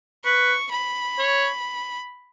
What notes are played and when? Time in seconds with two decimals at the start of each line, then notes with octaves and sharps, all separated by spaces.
0.24 B4 C#6
0.71 B5
1.19 C#5